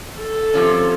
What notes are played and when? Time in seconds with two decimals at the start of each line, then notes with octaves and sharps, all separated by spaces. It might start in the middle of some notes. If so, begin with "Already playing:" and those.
0.20 A4
0.54 C3 F3 C#4